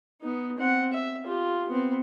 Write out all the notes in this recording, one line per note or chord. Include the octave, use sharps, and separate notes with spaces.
B3 D#4
C4 F#5
E5
F4 G4
B3 C4